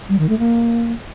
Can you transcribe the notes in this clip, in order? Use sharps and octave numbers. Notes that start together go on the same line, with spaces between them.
G3
D#3
A3
A#3